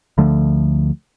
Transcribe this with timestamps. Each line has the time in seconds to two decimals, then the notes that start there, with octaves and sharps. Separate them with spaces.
0.18 D2 D3 F3 A3